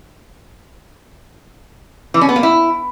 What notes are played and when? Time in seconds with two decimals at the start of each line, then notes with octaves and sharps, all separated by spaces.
2.14 E3
2.21 C#4
2.29 B3
2.36 A#3
2.43 E4